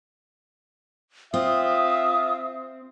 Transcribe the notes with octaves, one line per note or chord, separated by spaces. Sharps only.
C4 F4 E5 D#6